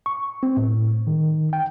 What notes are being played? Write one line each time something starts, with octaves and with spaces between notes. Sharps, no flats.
C#6
C4
A2
D#3
G5